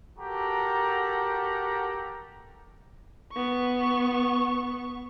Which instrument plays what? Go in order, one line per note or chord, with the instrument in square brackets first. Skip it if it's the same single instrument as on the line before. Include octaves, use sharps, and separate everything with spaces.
[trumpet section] F#4 G4 A4 A#4 F#5 A#5
[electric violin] B3 C#6